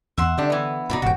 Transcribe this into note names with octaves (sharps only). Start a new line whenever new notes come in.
E2 E5 F#5 C6
D3 G3 D4
E3 B3
G2 B2 D#4 D5 B5
E1 A2 C3 F#4 G5